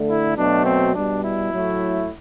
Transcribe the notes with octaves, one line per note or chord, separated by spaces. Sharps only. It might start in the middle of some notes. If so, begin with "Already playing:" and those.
Already playing: D3 A3
E4
B2 F#3 A3 D4
C4
B2 G3 D4
E4
A2 F#3 A3